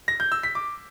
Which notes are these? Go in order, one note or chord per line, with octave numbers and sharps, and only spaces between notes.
A#6
G6
E6
B6
D6